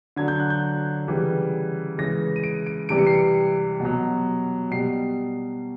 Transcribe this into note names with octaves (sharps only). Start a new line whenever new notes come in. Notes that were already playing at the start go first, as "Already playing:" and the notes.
D3 F#3 G#6
G6
F#6
G6
C#3 E3 G3
C#3 E3 G#3 A#6
D#7
D7
D7
C3 E3 G3 D7
C#7
C7
C#7
B2 F#3
B2 G3 C7